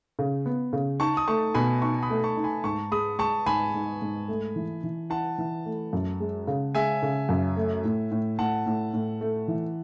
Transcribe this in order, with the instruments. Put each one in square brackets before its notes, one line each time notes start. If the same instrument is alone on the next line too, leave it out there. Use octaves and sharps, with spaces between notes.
[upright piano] C#3
B3
C#3
[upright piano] D#4 [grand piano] A5 C#6
[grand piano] D#6
[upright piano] A3 [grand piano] A5 C#6
[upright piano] B2 [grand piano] G#5 B5
[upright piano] D#4 [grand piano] A5 C#6
[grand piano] B5 D#6
[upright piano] A3
[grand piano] A5 C#6
[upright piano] D#4
[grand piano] G#5 B5
[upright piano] G#2 [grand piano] A5 C#6
[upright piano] G#3 [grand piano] B5 D#6
[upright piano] G#3 [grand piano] A5 C#6
[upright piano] G#2 [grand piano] G#5 B5
[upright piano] G#2
G#2
A3
E3
E3
[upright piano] E4 [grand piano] F#5 A5
[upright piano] E3
A3
F#2
G#3
C#3
[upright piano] G#3 [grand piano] E5 G#5
[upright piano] C#3
F#2
A3
A2
A2
[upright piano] A2 [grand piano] F#5 A5
[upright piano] A2
A2
A3
E3